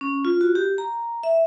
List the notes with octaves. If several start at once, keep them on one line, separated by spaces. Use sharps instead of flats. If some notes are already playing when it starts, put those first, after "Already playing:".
C#4
F4
F#4
G4
A#5
E5